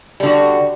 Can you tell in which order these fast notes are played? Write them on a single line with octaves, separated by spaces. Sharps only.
G3 D3 F#4